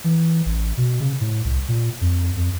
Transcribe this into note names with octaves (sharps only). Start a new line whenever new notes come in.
E3
A1
B2
C#3
A2
C2
A#2
F2
F2